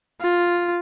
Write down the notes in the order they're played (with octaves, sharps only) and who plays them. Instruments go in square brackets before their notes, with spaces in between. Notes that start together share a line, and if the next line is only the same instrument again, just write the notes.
[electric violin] F4